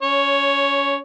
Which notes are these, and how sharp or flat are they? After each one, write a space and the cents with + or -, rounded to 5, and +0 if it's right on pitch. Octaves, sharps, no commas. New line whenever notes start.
C#4 +20 C#5 +0